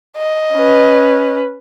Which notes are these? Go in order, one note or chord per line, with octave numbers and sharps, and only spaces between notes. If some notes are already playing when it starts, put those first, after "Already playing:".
D#5
C#4 B4